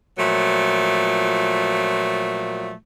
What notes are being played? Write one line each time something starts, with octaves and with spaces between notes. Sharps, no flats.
A#2 F3 F#3 A3